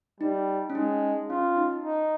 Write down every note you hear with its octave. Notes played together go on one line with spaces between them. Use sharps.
G3 D#4
C#4
G#3 D#4
C#4 F4
D#4
D#4